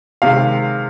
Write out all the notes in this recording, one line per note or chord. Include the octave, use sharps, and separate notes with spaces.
C3 D#3 G#3 F5